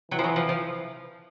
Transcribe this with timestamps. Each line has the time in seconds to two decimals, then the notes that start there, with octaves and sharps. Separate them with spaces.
0.11 E3 F#3
0.19 F3
0.24 F#3
0.36 F3
0.49 F3